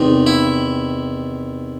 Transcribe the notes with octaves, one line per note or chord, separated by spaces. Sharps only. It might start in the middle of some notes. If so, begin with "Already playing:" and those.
Already playing: E2 C3 D#3 D#4
E4